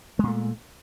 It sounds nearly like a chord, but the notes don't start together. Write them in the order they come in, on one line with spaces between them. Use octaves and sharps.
G#3 A#2 A3